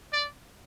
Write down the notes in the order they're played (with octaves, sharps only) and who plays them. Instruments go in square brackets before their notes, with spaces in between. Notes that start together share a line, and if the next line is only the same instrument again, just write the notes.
[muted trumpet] D5